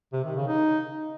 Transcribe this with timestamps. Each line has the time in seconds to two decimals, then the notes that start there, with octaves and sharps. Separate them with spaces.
0.13 C3
0.24 D#3
0.36 C#3
0.48 D#4